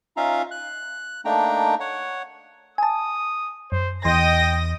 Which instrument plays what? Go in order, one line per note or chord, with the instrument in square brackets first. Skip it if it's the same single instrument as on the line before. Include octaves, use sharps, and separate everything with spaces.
[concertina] C#4 D#4 F4 E5 F5 A#5
F#6
A3 A#3 D4 D#4 G5 A#5
C#5 F#5
[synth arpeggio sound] G#5 A5 [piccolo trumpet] D#6
[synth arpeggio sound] F#2 [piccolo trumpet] C5
[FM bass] E2 [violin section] D#5 D#6 A#6 [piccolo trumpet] G5 [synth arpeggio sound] C6 G6